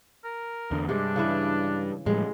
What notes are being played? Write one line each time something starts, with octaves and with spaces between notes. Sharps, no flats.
A#4
E2 D3
G2 C3 G#3 D4
C#3 E3 E4
A2 F3 G3 G#3